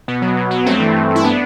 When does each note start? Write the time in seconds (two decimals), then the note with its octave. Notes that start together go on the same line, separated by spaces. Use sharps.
0.08 B2 B3
0.22 F#3
0.37 B2
0.51 F#3
0.66 G2 A3 C4
0.80 E3
0.96 G2
1.10 G2
1.16 E4
1.24 B3 D4